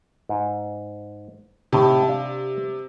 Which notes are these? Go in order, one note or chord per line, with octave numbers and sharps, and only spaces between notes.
G#2
A2 C3 D#4
D4 F5